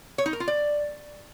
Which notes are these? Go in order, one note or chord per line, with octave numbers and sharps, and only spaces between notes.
C#5
D#4
A#4
F4
D5